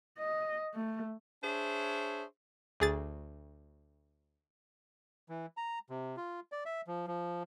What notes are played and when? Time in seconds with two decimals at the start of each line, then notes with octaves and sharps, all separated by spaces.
0.18 D#5
0.75 A3
1.44 D4 G#4 C5 C#5 E5
2.80 D2 G#4 A6
5.29 E3
5.57 A#5
5.90 C3
6.17 F4
6.52 D5
6.66 E5
6.87 F3
7.07 F3